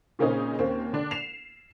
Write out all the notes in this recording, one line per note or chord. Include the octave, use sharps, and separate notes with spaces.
A#2 C#3 A#3 C4 C#4 D#4
D#2 A#3 C4 C#4
D3 D4
C7 E7 F7